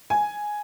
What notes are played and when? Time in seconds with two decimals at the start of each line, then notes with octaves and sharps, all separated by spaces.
0.10 G#5